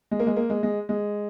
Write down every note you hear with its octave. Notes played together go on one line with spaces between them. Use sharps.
G#3
A#3
G#3
A#3
G#3
G#3
G#3